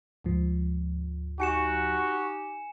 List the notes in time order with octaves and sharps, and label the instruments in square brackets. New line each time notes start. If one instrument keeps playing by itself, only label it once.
[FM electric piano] D2 G#2 F3
[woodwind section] D#4 G4 [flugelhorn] F#4 [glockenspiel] G#5 C#7 E7